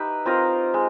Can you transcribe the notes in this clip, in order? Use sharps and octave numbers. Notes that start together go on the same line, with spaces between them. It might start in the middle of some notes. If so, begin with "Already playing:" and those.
Already playing: D#4 G4 B4 E5
C4 F4 A#4 D#5
G#3